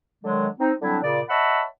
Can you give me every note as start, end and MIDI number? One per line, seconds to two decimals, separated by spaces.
0.24 0.48 50
0.24 0.48 51
0.24 0.48 54
0.24 0.48 56
0.60 0.72 60
0.60 0.72 63
0.80 0.98 50
0.80 0.98 54
0.80 0.98 55
0.80 0.98 60
0.80 0.98 62
0.80 0.98 64
1.03 1.22 46
1.03 1.22 49
1.03 1.22 74
1.29 1.63 73
1.29 1.63 75
1.29 1.63 76
1.29 1.63 78
1.29 1.63 81
1.29 1.63 83